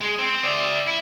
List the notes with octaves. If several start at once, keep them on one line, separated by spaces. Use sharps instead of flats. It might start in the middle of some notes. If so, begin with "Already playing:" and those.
G#3 G#4
C4
D5 E5
E4